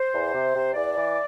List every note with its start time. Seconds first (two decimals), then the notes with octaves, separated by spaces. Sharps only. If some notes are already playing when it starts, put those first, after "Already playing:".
Already playing: C5
0.13 E2
0.33 C3
0.55 C3
0.74 E2 D5
0.95 E3